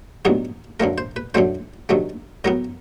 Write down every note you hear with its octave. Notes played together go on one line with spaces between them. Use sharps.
A1 G2 D#3 F#3 B3 G#4
F#2 D3 F3 A3 A#4
C5
B4
F#2 D3 F#3 A3 C5
G2 D#3 F#3 A3
A2 F#3 B3 A#4